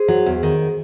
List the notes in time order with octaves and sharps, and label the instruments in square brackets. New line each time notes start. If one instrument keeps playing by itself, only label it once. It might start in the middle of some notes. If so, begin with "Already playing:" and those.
Already playing: [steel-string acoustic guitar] G#4 C5
F#3
E2
D#3